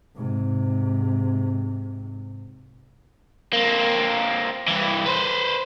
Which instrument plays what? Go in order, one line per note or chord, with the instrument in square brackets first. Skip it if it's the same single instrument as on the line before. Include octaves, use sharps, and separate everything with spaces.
[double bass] G#2 C3
[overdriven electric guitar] A#3 C4
G2 E3
B4 C5